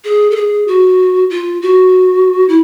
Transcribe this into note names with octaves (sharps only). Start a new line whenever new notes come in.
G#4
A4
G#4
F#4
F4
F#4
E4